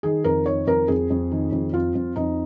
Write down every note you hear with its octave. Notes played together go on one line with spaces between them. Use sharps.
D#3 G#4
F2 A#4
D#3 C#5
F2 A#4
F2 G#4
F2
D#3
F2
F2 F4
F2
F2 D#4